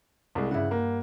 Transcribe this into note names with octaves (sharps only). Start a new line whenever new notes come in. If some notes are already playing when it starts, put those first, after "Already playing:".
C2 G#3
G2 C#3 E4 F#5
A#3